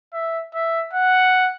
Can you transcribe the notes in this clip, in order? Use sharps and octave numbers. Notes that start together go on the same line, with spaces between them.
E5
E5
F#5